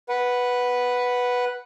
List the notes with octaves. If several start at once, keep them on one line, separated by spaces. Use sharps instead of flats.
B4 F#5